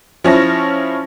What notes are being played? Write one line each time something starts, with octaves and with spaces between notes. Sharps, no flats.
F3 C#4 E4 A#6